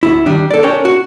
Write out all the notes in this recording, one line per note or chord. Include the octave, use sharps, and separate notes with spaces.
D2 E4
D#3 G3 D4
A4 D5
C#4 D4 A#4 C#5 G5
F#4